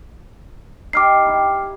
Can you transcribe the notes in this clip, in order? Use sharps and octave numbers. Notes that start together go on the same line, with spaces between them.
D#4 G4 D6 F6 C7
E4 G4